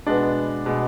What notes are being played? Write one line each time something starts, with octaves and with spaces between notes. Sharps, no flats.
B2 G#3 B3 D4
B2 G#3 B3